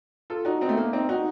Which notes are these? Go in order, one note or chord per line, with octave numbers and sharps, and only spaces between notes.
F4 A4
D#4 F#4
C4 D#4
A3
A#3
C4 D#4
D#4 F#4